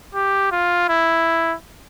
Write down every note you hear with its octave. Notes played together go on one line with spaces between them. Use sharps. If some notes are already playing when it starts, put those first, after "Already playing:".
G4
F4
E4